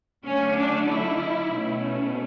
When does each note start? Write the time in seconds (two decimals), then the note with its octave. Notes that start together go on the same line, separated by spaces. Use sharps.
0.24 D3 F#3 A3 C#4
0.56 D4
0.87 E4
1.50 B2 A3 C#4